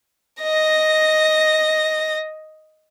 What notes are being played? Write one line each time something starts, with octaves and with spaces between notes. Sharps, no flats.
D#5 A#6